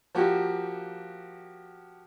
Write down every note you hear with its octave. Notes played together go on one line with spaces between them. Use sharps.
F3 A#3 F#4 G4